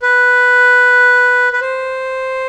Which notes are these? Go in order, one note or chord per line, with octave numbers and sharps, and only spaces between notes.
B4
B4
C5